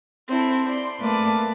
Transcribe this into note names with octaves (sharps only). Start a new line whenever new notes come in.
C4 E4 A4
D5 C6
A3 A#3 B4 D5 A5 D6